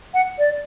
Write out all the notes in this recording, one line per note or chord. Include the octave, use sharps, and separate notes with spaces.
F#5
D5